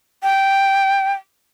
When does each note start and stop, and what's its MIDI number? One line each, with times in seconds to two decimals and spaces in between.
0.23 1.13 79